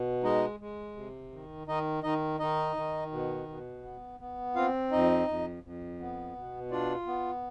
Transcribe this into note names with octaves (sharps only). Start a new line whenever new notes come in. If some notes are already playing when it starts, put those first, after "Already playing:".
Already playing: B2
G#3 D#4 D#5
G#3
C3
D#3
D#3 D#4 D#5
D#3 D#4 D#5
D#3 D#4 D#5
D#3
B2
B2
B3
B3
C4 F4 F5
F2 D#4 D#5
F2
F2
B3
B2
D4 F4 D5
B3